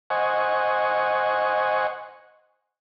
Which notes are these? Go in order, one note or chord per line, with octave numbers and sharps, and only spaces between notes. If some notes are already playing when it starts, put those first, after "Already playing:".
C5 D#5 F#5 G#5 C#6